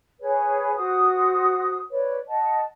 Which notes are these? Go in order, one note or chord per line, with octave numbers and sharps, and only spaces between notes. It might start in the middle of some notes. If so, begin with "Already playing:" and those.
G#4 B4 C#5
F#4 C5 D#6
B4 C#5 D5
D#5 F#5 A5